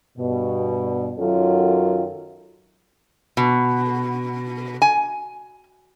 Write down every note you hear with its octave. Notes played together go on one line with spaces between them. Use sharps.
G2 B2
F#2 D#3 F#3 C#4 F4 A4
B2
G#5